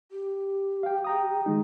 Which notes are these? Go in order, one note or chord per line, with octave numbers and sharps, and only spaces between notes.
G4
F5 G5
G5 A#5 D#6
D#3 G#3 D#4